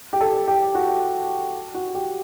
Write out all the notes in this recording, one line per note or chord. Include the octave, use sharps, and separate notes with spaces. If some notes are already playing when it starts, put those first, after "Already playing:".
G4
A4
G4
F#4
F#4
G4